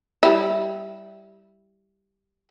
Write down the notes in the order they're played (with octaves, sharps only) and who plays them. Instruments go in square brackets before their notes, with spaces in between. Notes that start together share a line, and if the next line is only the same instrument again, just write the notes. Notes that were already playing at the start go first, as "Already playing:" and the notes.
[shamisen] G3 E4